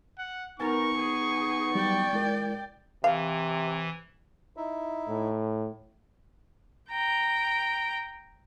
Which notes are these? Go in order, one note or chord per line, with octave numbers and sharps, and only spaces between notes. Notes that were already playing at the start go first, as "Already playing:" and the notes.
F#5
B3 D#4 A#4 G#5 C#6 A6
G#4
F#3 G3 F#4 D5 G5
G#3 E4 A#4
C3 E3 F5
D#4 E4 E5
A2
G5 A#5